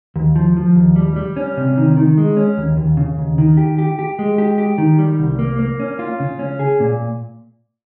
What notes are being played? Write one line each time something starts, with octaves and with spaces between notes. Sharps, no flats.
D#2
F3
F3
D#2
G3
G3
C#4
C3
D#3
D#3
G#3
C#4
D#2
D#2
C#3
D#2
D#3
G4
G4
G4
G#3
G4
G4
D#3
G3
C2
A#3
A#3
C#4
F4
C#3
C#4
G#4
A#2